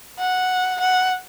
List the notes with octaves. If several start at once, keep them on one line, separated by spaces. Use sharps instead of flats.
F#5
F#5